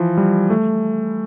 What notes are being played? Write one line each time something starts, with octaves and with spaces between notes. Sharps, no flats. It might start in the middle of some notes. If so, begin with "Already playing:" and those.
Already playing: E3 F3
G3
A3